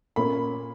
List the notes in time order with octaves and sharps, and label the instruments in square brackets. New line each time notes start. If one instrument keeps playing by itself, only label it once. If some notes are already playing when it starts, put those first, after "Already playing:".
[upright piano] A#2 A#3 C#4 B5